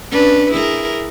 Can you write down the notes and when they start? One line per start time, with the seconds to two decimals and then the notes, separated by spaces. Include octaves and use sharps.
0.12 C#4 D4 B4
0.51 E4 G#4 A#4